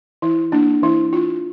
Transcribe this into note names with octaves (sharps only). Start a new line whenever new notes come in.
E3 E4
A#3 D4
E3 E4
D4 F4